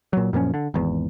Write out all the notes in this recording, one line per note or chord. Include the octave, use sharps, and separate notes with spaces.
A#2 F#3
F#2 A#2 F3 C#4
D3
G#1 E2